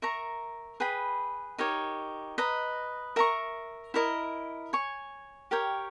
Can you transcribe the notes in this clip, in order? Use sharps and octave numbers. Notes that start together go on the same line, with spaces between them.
A#4 E5 A#5 C#6
G#4 B4 G5 B5
D#4 G4 A#4 C#5
B4 D#5 A#5
A#4 E5 A#5 C#6
E4 A#4 D#5
C#5 G#5 C#6
G4 A#4 C#5 G5